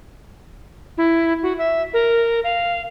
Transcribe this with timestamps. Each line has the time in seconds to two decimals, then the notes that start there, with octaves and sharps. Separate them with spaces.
0.98 E4
1.43 F#4
1.58 E5
1.94 A#4
2.44 F5